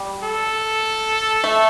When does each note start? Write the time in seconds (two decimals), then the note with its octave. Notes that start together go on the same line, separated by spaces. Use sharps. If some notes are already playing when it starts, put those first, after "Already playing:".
Already playing: G3
0.23 A4
1.44 A3